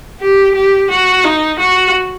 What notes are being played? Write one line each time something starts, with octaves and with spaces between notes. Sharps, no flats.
G4
G4
F#4
D#4
F#4